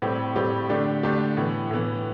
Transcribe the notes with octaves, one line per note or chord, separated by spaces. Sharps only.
A2 G3 C4 G4
A2 G3 C4 G4
D3 A3 D4 G4
D3 A3 D4 G4
A2 E3 B3
A2 E3 B3